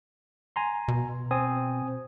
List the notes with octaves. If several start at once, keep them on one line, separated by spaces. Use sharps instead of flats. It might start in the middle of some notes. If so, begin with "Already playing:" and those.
G#5 A#5 C6
B2
C4 G#5 D#6